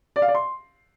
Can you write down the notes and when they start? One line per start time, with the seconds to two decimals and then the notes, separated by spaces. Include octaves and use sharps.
0.16 D5
0.22 F5
0.28 D5
0.35 C6